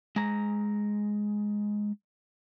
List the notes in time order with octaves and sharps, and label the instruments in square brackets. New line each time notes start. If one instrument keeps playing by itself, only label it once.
[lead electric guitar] G#3 A#5